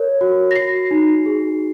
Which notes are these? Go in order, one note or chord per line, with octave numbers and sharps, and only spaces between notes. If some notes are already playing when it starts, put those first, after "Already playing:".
Already playing: A#4 C#5
F#4
A#6
F#4 C7
D#4
G#4